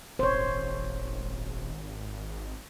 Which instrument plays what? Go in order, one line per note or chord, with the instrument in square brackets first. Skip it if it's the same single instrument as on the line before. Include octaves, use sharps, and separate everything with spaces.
[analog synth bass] D#1 [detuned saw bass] G#1 [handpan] C5 C#5